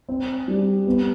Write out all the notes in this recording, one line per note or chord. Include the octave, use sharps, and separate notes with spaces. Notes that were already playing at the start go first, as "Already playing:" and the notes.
C4
G3
B3